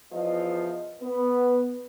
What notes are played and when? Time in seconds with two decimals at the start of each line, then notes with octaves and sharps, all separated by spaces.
0.13 E2 F3 D#5
1.02 B3